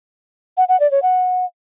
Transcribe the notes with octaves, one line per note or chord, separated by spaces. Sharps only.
F#5
F#5
D5
C#5
F#5